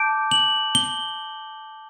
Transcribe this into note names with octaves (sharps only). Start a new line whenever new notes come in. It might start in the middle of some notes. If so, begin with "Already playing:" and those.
Already playing: A5 D6 G6 D7
F#7
G7